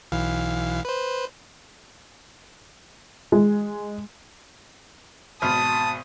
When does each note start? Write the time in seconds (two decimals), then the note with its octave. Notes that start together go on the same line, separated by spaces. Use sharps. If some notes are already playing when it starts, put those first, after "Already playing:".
0.12 B1 E3 F5
0.85 B4 C5
3.32 G#3
5.42 G#1 B2 A5 D#6 F6